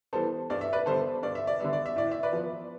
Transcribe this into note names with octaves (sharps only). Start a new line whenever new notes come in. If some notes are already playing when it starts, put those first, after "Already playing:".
E3 G3 B3 A4 C5
G2 D5
E5
B4 D5
D3 G3 B3 A4 C5
G2 D5
E5
D5
D3 G3 B3 E5
D5
E5
A2 D5
E5
B4 D5
F3 B3